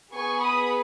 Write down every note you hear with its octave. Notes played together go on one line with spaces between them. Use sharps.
B3 G#4 G#5 C#6
B5 D#6